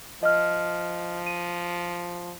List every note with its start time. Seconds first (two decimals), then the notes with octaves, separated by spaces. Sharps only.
0.23 F3 D#5 F6
1.26 D#7